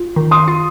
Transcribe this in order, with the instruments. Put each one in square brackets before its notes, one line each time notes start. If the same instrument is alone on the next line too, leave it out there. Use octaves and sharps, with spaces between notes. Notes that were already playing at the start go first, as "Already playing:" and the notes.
Already playing: [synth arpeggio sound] F4
D#3
[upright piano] C6 D#6
[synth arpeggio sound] F4